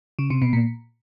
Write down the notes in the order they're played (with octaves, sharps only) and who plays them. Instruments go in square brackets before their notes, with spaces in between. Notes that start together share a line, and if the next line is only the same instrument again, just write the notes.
[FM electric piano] C#3
C3
B2
A#2